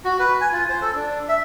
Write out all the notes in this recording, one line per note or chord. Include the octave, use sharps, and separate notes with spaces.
F#4
B4
G#5
F4
C5
A4
D4
E5